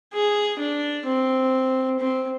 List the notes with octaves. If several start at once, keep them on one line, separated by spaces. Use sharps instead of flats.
G#4
D4
C4
C4